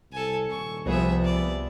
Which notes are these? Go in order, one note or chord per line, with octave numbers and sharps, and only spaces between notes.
C2 A4 G#5
D#1 C#6
C2 C3 F3 B3 G#4 E5
D5